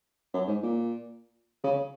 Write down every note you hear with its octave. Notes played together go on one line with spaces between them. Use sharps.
F#2
G#2
A#2
C#3